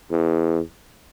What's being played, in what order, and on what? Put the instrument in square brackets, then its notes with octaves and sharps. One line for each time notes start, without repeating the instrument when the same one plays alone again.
[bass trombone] E2